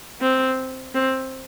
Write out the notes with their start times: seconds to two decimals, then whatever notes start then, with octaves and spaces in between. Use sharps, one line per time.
0.21 C4
0.94 C4